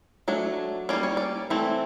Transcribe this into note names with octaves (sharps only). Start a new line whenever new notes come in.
F#3 A3 D4
G3 A#3 C#4 D5
C#5
D5
E3 A3 C4